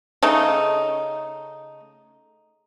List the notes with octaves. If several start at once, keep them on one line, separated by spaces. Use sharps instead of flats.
C#3 A3 D#4